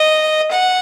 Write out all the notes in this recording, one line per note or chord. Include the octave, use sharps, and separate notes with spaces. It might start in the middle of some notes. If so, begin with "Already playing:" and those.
Already playing: D#5
F#5